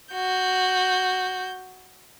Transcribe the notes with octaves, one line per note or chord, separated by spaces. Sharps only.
F#4 G6